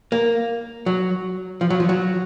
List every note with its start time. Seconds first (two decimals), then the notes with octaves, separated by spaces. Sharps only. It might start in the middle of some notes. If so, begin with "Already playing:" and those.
0.12 A#3
0.86 F#3
1.61 F3
1.70 F#3
1.80 F3
1.89 F#3